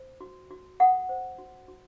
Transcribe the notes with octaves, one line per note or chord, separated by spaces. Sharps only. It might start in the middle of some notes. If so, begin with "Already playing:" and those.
Already playing: C5
F#4
F#4
A4 F#5
C5
F#4
F#4